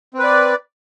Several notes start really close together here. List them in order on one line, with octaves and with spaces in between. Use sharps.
C4 B4 D5